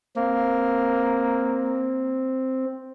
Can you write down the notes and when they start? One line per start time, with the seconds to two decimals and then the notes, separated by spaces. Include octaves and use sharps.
0.16 A#3 C4